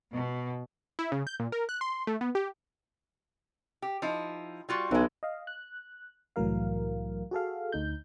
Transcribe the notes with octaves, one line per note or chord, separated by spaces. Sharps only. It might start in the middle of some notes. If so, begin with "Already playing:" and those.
B2
E4
C#3
G6
A#2
A#4
F#6
C6
A3
B3
G4
G4
F3 D#4 E4
G3 F4 F#4
B1 E3 G#3
D#5 F5
F#6
C2 A2 E3 F#3 A#4 F5
F#4 G#4 A4 F5
D2 D#4 G6